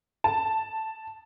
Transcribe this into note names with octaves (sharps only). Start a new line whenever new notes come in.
A5